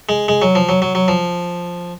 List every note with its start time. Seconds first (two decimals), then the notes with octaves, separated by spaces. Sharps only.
0.09 G#3
0.28 G#3
0.42 F#3
0.55 F3
0.69 F#3
0.82 F#3
0.95 F#3
1.08 F3